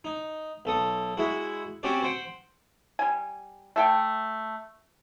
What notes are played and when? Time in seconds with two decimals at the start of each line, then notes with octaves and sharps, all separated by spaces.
0.04 D#4
0.65 B1 A4 D#6
1.17 G#3 E4 F#4
1.83 C4 C#4 F#4 G4 D5
2.02 C5 F#5 G5
2.99 G3 G#5
3.76 A3 A4 G5